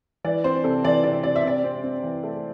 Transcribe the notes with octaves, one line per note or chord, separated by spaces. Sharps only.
E3 D5
C4 C5
C3 A4
E3 D5
C3 D5
C3 D5
E5
C3 D5
C4
C4
E3
A3